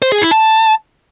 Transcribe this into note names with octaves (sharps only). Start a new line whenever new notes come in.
C5
G#4
E4
A5